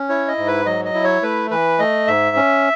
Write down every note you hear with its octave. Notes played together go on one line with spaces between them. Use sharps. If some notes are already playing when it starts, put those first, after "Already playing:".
Already playing: C#4
E4 C#5
D#5
G#2
B4
F#3 D#5
D#5
E4
C#5
A3 B4
E3 B4
A3 D#5
G#2 E5
C#4